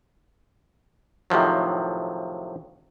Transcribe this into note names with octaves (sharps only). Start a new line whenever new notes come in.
A2 C3 D#3 F3 F#3